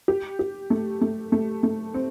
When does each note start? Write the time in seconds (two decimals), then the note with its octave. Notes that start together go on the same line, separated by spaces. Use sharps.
0.08 G4
0.39 G4
0.70 A3
1.01 A3
1.32 A3
1.63 A3
1.94 C4